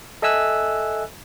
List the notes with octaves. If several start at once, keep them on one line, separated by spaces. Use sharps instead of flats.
A4 D#5 E5 G#5 E6 F#6